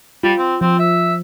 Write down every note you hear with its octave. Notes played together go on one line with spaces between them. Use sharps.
G3 F4
C4
F3 C4
E5